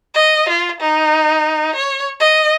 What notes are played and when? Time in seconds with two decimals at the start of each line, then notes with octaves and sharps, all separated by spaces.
0.14 D#5
0.49 F4
0.80 D#4
1.75 C#5
2.20 D#5